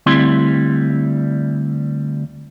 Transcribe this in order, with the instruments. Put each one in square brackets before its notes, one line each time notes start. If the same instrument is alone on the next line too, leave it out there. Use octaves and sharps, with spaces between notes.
[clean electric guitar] D2 G3 C4 E4 C6